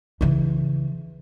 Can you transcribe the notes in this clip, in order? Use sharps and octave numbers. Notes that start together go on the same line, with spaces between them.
C#3 E3